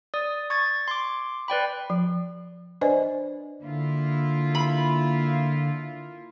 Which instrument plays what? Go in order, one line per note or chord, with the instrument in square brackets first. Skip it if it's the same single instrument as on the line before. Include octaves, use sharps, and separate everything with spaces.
[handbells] D5 D#6
C#6 G#6 A6
C6 D6
B4 D5 G5 B5
[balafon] F3
D4 B4 C5 D5 D#5 G#5
[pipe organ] D3 [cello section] A#3 E4 F4
[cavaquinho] B5